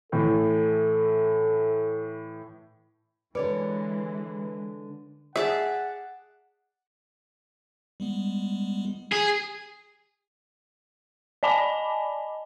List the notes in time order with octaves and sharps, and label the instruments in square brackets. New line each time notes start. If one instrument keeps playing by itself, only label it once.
[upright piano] A2 E3 [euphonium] A4
[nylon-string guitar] D3 C#5 D5 [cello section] E3 G#3 [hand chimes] B4
[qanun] G#4 D5 A5 [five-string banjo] E5 [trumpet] F#5
[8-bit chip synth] G3 G#3 B3
[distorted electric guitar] G#4
[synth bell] D5 D#5 G#5 A5 B5 D6